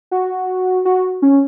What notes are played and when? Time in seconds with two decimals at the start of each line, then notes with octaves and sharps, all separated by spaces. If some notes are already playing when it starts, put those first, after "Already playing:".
0.11 F#4
0.85 F#4
1.22 C#4